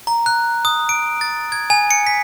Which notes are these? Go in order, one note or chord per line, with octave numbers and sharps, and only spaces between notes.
A#5
F#6
D#6
D7
A6
G#6
G#5
C#7
B6